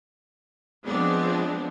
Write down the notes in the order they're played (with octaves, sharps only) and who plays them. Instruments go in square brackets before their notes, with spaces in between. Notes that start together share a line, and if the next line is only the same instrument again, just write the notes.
[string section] F3 G#3 B3 C4 D4